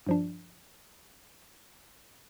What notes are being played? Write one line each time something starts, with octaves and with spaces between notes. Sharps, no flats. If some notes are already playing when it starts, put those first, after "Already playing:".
G2 F3 D4